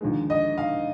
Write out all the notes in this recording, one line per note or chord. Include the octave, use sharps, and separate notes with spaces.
D#2 D3 F3 G#3
D#5
F5